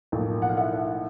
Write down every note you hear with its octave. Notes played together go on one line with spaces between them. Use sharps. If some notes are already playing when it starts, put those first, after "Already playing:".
B1 A2 F3 A#3
F#5
F5
E5 F#5
E5 F#5